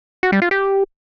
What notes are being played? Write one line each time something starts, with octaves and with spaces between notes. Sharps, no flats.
F#4
G3
F4
G4